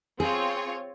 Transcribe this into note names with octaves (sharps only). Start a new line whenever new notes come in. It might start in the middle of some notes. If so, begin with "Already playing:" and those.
C4 F4 G#4 C#5